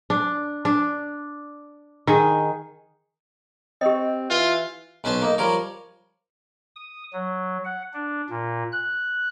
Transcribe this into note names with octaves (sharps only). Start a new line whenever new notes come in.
D4
D4
D#3 G#4
C4 G4 D#5
E3 F4
B1 C#4 B4 C5 A5
A#3 D#4
F3 G3 A#4 C#5
D#6
F#3
F#5
D4
A#2
F#6